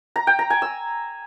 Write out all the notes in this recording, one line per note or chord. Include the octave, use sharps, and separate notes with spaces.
A#5
G5
A#5
G#5
E6